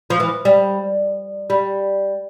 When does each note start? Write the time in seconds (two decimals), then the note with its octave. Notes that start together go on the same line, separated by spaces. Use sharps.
0.10 F3
0.20 E3
0.45 G3
1.50 G3